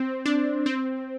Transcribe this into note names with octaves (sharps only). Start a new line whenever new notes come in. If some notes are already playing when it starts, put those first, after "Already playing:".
Already playing: C4
D4
C4